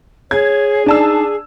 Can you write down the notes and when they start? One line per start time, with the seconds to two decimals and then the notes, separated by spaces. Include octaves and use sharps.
0.31 G#4 C#5 G#6
0.86 D4 D#4 A5 E6